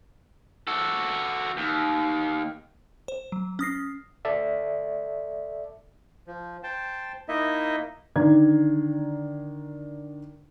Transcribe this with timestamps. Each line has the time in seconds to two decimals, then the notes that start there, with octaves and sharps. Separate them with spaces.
0.67 F#4 A4
1.57 D#2
3.08 C5
3.32 F#3
3.59 C#4 D#6 A#6 C7
4.25 A4 D5 E5
6.27 F3
6.63 C5 G5 A5
7.28 A#3 D#4 E4 D#5 E5
8.16 D3 D#3 D4 D5 A#5 G#6